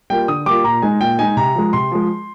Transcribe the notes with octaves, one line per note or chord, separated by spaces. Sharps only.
G3 A#3 F4 G5
D3 D#6
G3 A#3 F4 D6
A#2 A#5
G#3 D#4 G#5
A#2 G5
G#3 D#4 G#5
C3 A#5
F3 G#3
C3 C6
F3 G#3